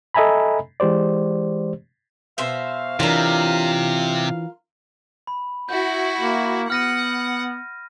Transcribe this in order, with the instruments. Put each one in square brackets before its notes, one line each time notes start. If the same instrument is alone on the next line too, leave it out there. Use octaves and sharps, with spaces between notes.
[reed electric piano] A4 D#5 E5 G#5 A#5 B5
E3 G#3 G4 C5 D5
[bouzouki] B2 C5 E5 [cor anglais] F5
[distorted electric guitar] C3 [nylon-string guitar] E3 C#4 D4 [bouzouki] F4 A#4
[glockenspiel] B5
[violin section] E4 F#4 [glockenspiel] G6
[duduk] A#3
[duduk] B3 [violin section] F#5 [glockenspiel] F6 A#6 D#7